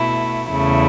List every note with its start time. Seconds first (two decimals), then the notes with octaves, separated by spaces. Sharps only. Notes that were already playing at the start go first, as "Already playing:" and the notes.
Already playing: B2 A3 E4
0.49 E2 C#3 A3 E4